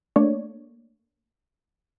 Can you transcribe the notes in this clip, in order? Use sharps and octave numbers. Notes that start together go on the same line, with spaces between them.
A3 A#3 D4 C#5 D5